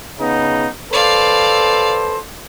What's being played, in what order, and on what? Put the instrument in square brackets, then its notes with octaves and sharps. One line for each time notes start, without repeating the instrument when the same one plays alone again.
[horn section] C#3 B3 D#4
[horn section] A4 B4 C5 [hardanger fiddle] D5 F5